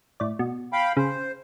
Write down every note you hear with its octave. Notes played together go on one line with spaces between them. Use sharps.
A2 D5
B2
F5 G5 B5
C#3 C5